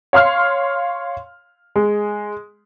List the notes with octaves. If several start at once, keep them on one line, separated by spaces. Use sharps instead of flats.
C#5 F5 C6 F6
G#3